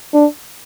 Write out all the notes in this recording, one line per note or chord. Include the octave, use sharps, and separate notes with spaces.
D4